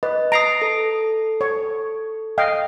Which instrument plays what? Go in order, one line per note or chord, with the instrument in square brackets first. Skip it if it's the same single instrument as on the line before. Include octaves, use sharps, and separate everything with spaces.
[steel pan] B4 [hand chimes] D#5
[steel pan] A#5 [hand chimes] D#6 C7 D7
[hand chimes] A4
[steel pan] C#5
D#5 F5 G5